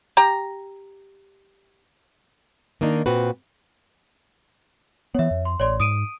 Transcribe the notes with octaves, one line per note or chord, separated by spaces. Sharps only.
G4 A#5
D#3 A#3 D4 D#4
A#2 C4 F#4 B4
E3 B3 C#5 E5
F2
C6
A1 C#5 D5 C6
G#2 D#6 D7 D#7